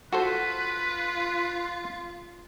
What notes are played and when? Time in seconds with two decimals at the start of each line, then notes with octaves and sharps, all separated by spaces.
0.13 F4 F#4 A4 B4 C5